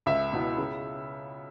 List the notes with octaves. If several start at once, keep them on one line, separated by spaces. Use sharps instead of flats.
C#2 E5
B2 B3 E4
C#3